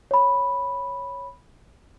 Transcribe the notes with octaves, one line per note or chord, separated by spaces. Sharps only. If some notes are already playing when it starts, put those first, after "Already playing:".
C#5 B5